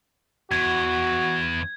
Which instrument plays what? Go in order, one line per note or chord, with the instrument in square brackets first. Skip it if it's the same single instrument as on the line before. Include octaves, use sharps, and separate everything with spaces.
[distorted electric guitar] E2 [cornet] F#4 [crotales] G#6